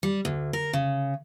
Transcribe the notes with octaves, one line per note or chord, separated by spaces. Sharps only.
G3
D2
A#4
C#3